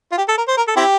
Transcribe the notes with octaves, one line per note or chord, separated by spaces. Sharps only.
F4
G4
A4
A#4
C5
A#4
A4
C4 E4 G4